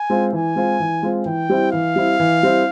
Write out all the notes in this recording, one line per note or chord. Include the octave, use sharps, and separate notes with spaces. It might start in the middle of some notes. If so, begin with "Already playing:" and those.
Already playing: G#5
G#3 C4 F4
E3 G#5
G#3 C4 F4
E3
G#3 C4 F4
E3 G5
G3 C4 E4
E3 F5
G3 C4 E4
E3
G3 C4 E4